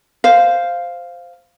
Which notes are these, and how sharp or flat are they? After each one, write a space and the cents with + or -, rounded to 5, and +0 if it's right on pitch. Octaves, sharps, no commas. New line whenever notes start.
C5 -5 F5 +0